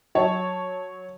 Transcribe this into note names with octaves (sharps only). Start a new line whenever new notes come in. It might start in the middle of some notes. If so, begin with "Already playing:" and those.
F#3 C#5 A5